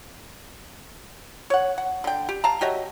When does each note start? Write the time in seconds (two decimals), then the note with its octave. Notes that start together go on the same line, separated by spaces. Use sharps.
1.50 C#5 F#5
1.78 F#5
2.04 D3 G5
2.29 G4
2.44 F5 A5 A#5
2.61 F#3 G4 D#5 E5